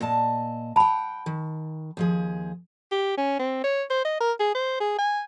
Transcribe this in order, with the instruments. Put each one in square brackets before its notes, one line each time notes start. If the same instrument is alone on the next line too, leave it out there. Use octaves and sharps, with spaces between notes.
[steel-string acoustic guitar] A#2 D#5 A5
[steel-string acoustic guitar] F#5 G5 [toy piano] A5 B5
[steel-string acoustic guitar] D#3
D#2 F3 G#4
[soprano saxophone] G4
C#4
C4
C#5
C5
D#5
A#4
G#4
C5
G#4
G#5